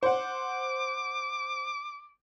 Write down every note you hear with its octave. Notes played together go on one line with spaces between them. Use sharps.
C5 F#5 D6